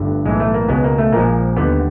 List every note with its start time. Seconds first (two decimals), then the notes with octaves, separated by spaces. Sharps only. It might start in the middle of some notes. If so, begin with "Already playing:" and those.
Already playing: G1 G2 D3 A3
0.26 B1 A2 E3 G#3
0.40 A3
0.54 A#3
0.68 C#2 B2 G#3 B3
0.84 A#3
0.98 A3
1.12 A#1 A#2 F3 G#3 A#3
1.57 D#2 D3 G3 B3